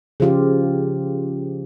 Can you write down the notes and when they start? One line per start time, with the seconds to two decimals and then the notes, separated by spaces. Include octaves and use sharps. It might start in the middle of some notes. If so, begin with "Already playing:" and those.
0.20 C#3 F3 F4 G4